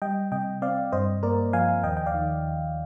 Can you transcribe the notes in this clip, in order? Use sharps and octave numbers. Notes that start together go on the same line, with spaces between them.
G3 D#5 G5
C3 D#5 G5
C4 D5 F5
G2 C5 D#5
A#3 A#4 D5
F3 F5 G#5
D#2 D#5 G5
G5
D5 F5
D#3